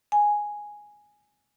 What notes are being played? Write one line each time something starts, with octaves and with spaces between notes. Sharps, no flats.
G#5